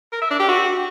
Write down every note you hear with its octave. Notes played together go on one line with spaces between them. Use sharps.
A#4
E5
D4
G4
F#4